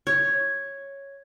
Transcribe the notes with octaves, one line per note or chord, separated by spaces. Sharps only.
C#5